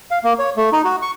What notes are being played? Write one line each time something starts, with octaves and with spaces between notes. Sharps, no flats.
F5
A#3
C#5
A3
D#4
F#4
C#6